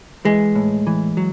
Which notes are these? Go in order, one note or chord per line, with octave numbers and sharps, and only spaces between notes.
E3 G#3
A2
E3
F#3